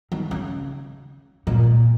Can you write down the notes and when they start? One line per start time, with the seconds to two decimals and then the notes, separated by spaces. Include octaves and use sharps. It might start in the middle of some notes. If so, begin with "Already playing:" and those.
0.12 D#3
0.31 C#3
1.47 A#2